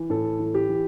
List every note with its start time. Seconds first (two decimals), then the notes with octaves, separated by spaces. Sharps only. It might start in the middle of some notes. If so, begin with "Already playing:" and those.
Already playing: E3
0.10 A2 A4
0.39 E3
0.54 G4
0.69 E3